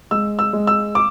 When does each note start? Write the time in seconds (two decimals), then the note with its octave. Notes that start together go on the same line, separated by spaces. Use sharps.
0.11 G#3 E6
0.39 E6
0.53 G#3
0.67 E6
0.95 D6